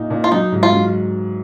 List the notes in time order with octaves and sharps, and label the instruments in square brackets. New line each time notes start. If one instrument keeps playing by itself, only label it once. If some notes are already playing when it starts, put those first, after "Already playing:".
Already playing: [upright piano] A#2 D#4
A#2
[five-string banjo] F4
[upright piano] F#3 [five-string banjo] D#4
[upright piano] G#2
[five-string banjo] F4
[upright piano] F#3